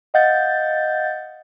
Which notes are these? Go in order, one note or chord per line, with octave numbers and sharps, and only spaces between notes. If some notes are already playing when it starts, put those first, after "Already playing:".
D#5 F5 F#5 G6 A6